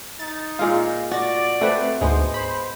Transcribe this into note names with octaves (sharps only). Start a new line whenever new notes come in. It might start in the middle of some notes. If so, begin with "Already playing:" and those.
D#4 A6
A#2 G#3 F4 F5
F#4 D5 A6 A#6
A3 C4 B4 C5
D2 G#2 G#3 B3 C5
C5 B5